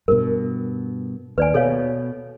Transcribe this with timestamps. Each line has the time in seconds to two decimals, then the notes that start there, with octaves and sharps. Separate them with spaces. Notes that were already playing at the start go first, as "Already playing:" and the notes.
0.08 G2 B2 A#4
1.38 D#2 B4 D5 G#5
1.54 B2 A4 C#5 F5